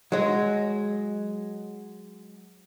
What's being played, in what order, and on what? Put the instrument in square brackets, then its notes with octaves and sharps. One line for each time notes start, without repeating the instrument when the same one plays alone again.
[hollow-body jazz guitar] F#3 G#3